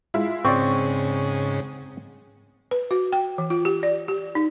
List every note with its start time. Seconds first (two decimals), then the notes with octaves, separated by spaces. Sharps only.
0.14 G#3 E4 F4
0.45 G#2 C#3 C4 D5 C#6
2.71 B4
2.91 F#4
3.12 G5
3.38 E3
3.50 F4
3.65 G4
3.83 D5
4.08 G4
4.35 D#4